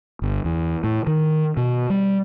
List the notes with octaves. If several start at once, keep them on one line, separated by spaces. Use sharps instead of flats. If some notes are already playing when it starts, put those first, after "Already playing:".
G1
E2
A2
D#3
B2
G3